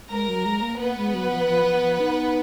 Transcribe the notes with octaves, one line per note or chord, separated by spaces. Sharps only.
G#3 A#4 A#5
F#3
G#3
A#3
A#3 B3 B4
G#3
F#3
F3
F3
F3
F3
D#4